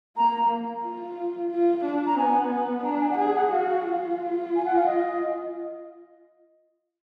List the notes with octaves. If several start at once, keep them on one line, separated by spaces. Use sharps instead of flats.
A#3 A#5
F4
F4
D4
A#5
B3 G#5
D4 A#5
G#5
F#5
G#4 G#5
F#5
F#4 F5
F4
G#5
F#5
F5
D#5